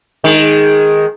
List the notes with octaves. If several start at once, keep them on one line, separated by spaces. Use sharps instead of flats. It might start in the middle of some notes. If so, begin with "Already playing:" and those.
D#3 G#3